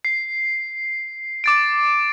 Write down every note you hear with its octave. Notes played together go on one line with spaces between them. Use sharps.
C7
D6 A6 D7